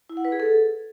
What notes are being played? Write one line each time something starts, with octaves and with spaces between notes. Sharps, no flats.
E4
F#5
B4
G#4
A4